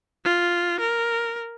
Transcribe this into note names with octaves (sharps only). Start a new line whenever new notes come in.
F4
A#4